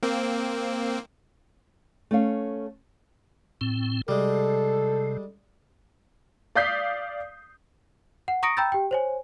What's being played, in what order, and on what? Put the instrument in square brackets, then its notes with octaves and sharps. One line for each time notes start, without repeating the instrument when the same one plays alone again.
[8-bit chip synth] A#3 C4
[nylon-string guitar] A3 C#4 F5
[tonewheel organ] A2 C4
[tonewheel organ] C3 [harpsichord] G3 G#3 [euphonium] A4
[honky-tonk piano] D5 F5 D#6 G6 B6 C7
[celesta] F#5
A#5 C#6 D#6 A#6 C#7 D7
G5 A#5 B5 E6 G6 A6
G4 G5
C5 C#5 G#5